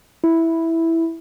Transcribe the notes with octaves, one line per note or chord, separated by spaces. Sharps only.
E4